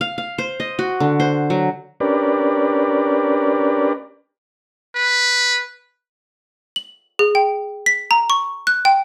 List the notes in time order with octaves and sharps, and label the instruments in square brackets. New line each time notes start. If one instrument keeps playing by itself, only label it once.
[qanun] F5
F5
C5
D#5
F#4
D3
C5
F#3
[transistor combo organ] C#4 D4 G4 A#4 B4 D5
[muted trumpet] B4
[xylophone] F#7
G#4
G5
B6
A#5
C#6
F#6
G5